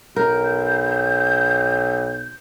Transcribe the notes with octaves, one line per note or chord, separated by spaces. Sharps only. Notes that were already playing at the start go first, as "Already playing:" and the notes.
B1 A#4 G6